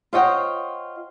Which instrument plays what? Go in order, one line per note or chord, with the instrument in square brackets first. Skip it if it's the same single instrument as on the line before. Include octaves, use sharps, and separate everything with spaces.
[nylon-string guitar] F4 C5 C#5 D#5 F#5 G5